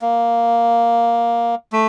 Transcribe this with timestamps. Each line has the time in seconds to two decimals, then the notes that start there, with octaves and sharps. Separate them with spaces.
0.02 A#3
1.72 A3